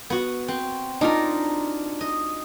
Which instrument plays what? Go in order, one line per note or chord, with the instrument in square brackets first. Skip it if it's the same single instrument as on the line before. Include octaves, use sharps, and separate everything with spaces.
[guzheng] B3 F#4
C4
[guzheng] D4 [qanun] D#4 F4 A#4
[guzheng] D#5